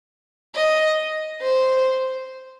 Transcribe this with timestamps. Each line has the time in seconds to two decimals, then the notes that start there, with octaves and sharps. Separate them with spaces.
0.55 D#5
1.42 C5